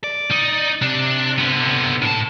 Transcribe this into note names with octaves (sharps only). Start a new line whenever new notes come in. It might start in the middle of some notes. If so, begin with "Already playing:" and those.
D5
D#4
C3 D4
D3 B3
A2 A5